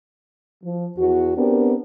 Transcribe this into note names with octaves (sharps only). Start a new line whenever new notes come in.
F3
E2 F#4
B3 C4 D4 G4 A#4